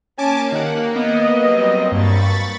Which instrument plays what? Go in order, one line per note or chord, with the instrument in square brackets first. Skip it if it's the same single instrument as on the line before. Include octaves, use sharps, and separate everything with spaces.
[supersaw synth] A#3 [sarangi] C#4 [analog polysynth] G#5 A5 D6
[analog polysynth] D#3 F#5 [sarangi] G4
[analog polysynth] B3 [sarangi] D#5
[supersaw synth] F#3 G3 C4
[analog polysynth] G2 [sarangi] A#3 [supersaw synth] B5 C#6 A6